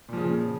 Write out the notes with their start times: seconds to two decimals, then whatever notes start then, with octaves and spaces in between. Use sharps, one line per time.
0.09 A#2
0.13 F3
0.17 C#3